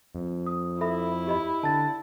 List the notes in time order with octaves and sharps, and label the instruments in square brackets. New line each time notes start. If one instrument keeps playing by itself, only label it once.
[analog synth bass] F2
[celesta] D#6
[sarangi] E4 [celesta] A4 E5 B5
[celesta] G4 D#5 B5
[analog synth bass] D3 [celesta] A5 A6